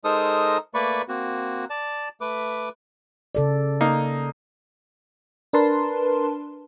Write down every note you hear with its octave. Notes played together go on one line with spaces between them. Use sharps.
G#3 D#4 A4 A#4 C5 D#6
A3 A#3 B4 D5 B5 C#6
A#3 C4 F#4
D5 A5
A3 B4 D6
C#3 A4 D5
A#3 D#4
D4 A#4 B4 A5 C6